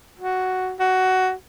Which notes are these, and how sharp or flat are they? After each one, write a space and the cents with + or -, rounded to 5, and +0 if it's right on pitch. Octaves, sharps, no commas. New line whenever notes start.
F#4 +5
F#4 +10